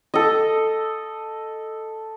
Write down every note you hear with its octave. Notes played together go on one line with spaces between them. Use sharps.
A4 D#5